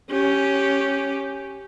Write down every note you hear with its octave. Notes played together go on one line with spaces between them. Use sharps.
C#4 G4